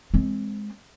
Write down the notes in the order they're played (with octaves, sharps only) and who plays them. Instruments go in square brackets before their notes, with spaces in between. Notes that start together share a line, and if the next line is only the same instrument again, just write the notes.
[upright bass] G#3 C4